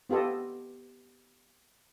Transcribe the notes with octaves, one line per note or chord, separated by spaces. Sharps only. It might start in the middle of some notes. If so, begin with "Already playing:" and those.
B3 F4 G4 A4 D#5